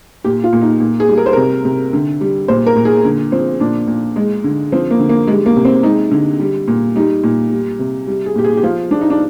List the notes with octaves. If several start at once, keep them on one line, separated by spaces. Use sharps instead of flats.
A#2 G4
F4
A#2
D#4
A#2
G#4
G3
A#4
C5
C3 A#4
C3
D3
G3
A#2 C5
A#4
A#2
G#4
D3
F3 C4
A#2 D4
A#2
G#3
D3
F3 C4
A#3
D3
A#3
G3 G#3
A#3
C3
C4
G#3 D#4
D3
G3
A#2
G3 D#4
A#2
G3
C3
G3
G#4
A#2 G4
G#4
G4
F3 F4
F3 D4
D#4
D4